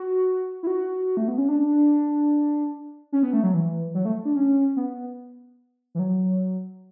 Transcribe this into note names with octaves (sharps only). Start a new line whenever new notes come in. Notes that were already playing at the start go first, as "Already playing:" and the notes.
Already playing: F#4
E4
F#4
A3
B3
C#4
D4
C#4
B3
A3
F#3
E3
F#3
A3
D4
C#4
B3
E3
F#3